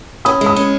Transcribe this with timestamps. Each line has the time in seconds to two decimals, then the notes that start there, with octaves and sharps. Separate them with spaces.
0.25 C#4 B5 D#6
0.41 G#3
0.46 B5 D#6
0.56 C#4